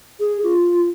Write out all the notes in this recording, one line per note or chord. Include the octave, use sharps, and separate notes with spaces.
G#4
F4